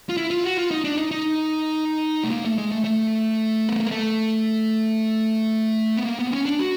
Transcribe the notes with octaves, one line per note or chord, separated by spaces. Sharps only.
F4
E4
F4
F#4
F4
D#4
D4
D#4
D#4
A3
A#3
A3
G#3
A3
A3
B3
A#3
A3
B3
A#3
B3
C4
C#4
D4
F#4